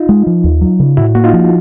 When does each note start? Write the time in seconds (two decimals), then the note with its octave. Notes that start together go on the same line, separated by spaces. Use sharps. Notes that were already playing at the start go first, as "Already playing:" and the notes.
Already playing: D#4 F4
0.09 G#3
0.27 F3
0.44 D#2
0.61 F#3
0.80 C#3
0.97 A2 E4 F#4
1.15 A#3 F#4
1.24 D#4 F4
1.33 F3